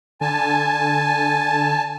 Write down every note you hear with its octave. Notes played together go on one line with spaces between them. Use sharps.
D3 G#5 A5